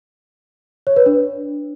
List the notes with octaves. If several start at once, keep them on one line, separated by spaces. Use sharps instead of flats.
C#5
B4
D4